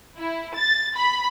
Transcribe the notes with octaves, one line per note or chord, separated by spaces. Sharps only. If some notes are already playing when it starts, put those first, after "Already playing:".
E4
A6
B5